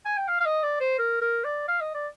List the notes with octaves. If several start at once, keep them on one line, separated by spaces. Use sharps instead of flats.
G#5
G5
F5
F5
D#5
D5
C5
A#4
A#4
D5
F5
D#5
D5